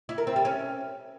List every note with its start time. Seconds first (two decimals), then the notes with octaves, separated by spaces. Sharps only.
0.09 E4
0.18 A#4
0.27 C4
0.36 G3
0.45 C#4